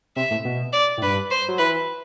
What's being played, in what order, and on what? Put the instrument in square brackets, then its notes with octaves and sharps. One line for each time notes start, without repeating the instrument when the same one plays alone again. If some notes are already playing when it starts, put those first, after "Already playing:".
[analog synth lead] C3 [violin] E5
[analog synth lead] A2
B2
[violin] D5
[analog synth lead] A2
[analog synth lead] G2 [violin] B4
[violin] C5
[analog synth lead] F#3
[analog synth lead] E3 [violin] B4